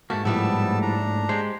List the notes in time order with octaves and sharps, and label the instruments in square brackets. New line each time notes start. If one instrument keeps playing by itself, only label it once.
[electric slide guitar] G#2 A3 A#3 [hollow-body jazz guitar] F#4 [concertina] A5
[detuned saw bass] A2 [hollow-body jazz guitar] F3 G3 E4 [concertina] B3 A5 E6
[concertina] D4 A#5
[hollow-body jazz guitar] G#3 [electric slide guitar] G4 C5